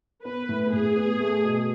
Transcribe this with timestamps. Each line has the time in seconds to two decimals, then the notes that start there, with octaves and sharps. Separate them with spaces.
0.24 B3 B4
0.49 A2
0.72 A2 G#4
0.96 B3
1.20 A3
1.44 B2